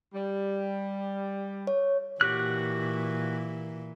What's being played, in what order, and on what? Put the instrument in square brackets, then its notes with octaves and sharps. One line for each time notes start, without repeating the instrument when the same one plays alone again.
[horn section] G3
[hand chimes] C#5
[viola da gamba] A#2 E3 [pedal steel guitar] F#4 G4 F#6